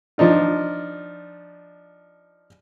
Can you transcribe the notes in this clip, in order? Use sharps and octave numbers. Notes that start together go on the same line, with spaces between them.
F3 D4 D#4 F4